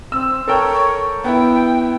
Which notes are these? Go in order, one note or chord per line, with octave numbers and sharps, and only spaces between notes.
C4 E6
A4 A#4 C#5 G5
B3 E4 G5